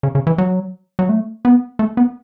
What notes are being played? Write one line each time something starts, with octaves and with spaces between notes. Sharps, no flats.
C#3
C#3
E3
F#3
F#3
A3
B3
A3
B3